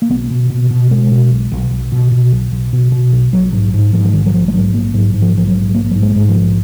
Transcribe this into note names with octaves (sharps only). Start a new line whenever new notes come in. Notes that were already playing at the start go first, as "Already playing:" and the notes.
A#3
B1 B3
B2
B2
B2
B2 G#3
B2
B1
B1
B1
B2
B2
B1
B1
B2
B2
B1
A#1 F#3
G#2 F#3
G#2
G#2 F3
F3
A#1 D#3
F#3
A#1 F3
G#3
G#2 F#3
A#1 A#3
G#2 F#3
G#2
F3
A#1 F3
F#3
G#2
A#1 A#3
G#2 F#3
G#3
G#2
F3
A#1